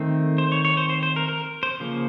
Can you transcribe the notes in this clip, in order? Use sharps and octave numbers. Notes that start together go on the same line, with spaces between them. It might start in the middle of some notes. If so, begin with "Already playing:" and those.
Already playing: D#3 A3 C4
C5
C#5
C#5
C5
C5
C5
A#4
A#4
C5
C#3 F3 A#3